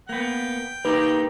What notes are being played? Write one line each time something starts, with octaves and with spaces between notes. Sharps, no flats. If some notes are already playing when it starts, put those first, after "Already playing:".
A#3 B3 G5
A#3 D#4 G4 B4